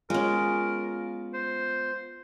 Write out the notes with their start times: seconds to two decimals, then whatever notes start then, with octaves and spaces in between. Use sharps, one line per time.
0.10 G#3 B3 C#4 F4 A#4
1.34 C5